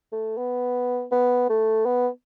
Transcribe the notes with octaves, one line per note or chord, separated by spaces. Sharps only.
A3
B3
B3
A3
B3